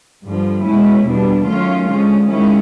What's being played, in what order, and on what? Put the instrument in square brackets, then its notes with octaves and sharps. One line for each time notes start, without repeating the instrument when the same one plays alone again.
[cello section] G2 D3 F3
B2 G#3 C#4 E4
E2 B2 G3 B3 D4
D#3 F#3 A3 C#4 F4
D3 F3 G#3 C#4
D#3 G#3 C#4 E4